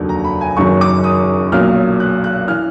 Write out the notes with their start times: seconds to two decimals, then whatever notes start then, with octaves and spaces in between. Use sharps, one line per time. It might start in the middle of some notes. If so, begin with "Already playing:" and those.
Already playing: F1 D#2 D3 F#3
0.09 A#5
0.24 B5
0.41 G#5
0.57 F#1 F#2 D#3 F#3 C#6
0.81 D6
1.04 D#6
1.52 B1 A#2 F#3 F6
2.00 F#6
2.24 F#6
2.48 E3 F6